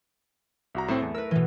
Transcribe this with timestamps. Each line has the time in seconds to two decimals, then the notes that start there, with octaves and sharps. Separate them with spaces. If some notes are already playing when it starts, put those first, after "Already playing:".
0.75 C2 F#4 A#5
0.88 A2 A3 C4 E4
1.02 E2
1.15 A#4 B4 E6
1.31 B2 E3